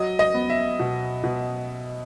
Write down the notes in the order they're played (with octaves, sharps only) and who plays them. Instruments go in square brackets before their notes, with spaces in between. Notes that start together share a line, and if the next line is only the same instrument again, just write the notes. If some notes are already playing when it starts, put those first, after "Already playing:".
Already playing: [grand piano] F#3 D#5
D#5
B3
E5
B2
B2